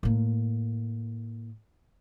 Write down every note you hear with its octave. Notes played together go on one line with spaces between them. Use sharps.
A2 A#3